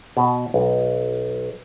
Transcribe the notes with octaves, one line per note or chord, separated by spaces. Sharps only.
B2
B1